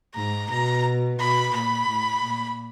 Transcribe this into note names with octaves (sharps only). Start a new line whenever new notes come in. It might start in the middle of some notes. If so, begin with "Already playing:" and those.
G#2 A#5
B2 A#5
B2 B5
A#2 B5
A2
A#2